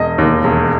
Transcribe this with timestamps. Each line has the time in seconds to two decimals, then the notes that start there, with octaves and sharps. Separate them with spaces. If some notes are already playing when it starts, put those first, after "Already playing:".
Already playing: E1 D#5
0.18 D#2
0.44 E1